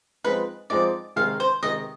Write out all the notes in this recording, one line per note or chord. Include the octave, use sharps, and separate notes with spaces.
F3 G#3 C4 D#4 B4
F3 G#3 C4 D#4 D5
C3 D#3 G#3 F5
C5
C3 D#3 G#3 D#5